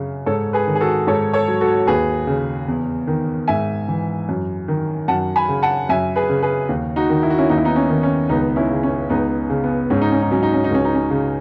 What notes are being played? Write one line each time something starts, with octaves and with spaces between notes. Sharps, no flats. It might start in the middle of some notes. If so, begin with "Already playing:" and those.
Already playing: F#2 C#3
G#2 A4 C#5
G#4 B4
D#3
G#4
F#4 A4
G#2 A4 C#5
A4 C#5
F#3
F#4 A4
D#2 G#4 B4
C#3
E2
D#3
G#2 E5 G#5
E3
F#2
D#3
F#2 F#5 A5
G#5 B5
C#3
F#5 A5
F#2 E5 G#5
G#4 B4
C#3
G#4 B4
D#2
D#4 F#4
D#3
E4
F#4
C#4 E4
D#2 D#4
E4
B3 D#4
C#4
D#3
C#4
C#2 B3 D#4
C#4 E4
C#3
C#4
C#2 B3 D#4
C#3
B3
G#2 C#4
D#4
C#4
D#4
F#3 C#4
D#4
C#4
D#4
C#2 C#4
D#4
C#4
C#3